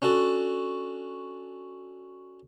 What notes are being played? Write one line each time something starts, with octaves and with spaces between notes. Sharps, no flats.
C#4 D4 F#4 A4